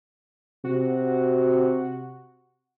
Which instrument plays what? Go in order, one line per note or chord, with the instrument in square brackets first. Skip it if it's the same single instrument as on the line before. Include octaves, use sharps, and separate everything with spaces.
[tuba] C3 [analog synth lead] F#4